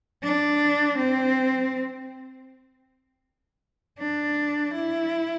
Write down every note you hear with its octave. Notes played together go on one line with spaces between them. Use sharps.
D4
C4
D4
E4